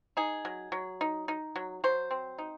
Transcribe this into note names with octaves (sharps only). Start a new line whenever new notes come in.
D#4 G#4
F#3
F#3
D#4
D#4
F#3
F#3 C5
C4
D#4